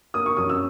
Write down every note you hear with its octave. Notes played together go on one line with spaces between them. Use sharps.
A#3 D#6
C#6
F#2 D#6
E6